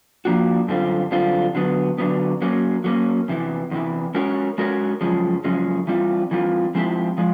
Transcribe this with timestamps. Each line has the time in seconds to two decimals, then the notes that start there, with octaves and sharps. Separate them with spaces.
0.25 F3 A#3 D4 F#4
0.68 F#2 D3 G3 C4 F4
1.11 F#2 D3 G3 C4 F4
1.55 D3 F#3 B3
1.98 D3 F#3 B3
2.42 F#3 A#3 C#4
2.84 F#3 A#3 C#4
3.28 E2 C3 E3
3.71 E2 C3 E3
4.14 G#3 C#4 F#4 A#4 C#5
4.58 G#3 C#4 F#4 A#4 C#5
5.01 F#2 C#3 F3 G#3 C#4
5.44 F#2 C#3 F3 G#3 C#4
5.87 E3 G3 C4 F4
6.31 E3 G3 C4 F4
6.75 F3 G#3 C4 E4 G4
7.18 F3 G#3